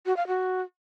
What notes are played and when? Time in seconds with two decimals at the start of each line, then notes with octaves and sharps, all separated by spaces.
0.06 F#4
0.17 F5
0.27 F#4